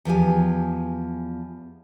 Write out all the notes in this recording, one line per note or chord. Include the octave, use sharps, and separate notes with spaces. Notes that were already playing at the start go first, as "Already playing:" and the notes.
E2 F3 G4 G#5